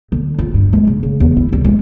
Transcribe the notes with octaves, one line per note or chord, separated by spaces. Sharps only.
D3
F4
G2
G#3
C#3
C#3
E2
E4
C2
G#3